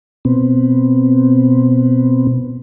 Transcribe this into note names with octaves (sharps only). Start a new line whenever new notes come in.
B2 B3 C4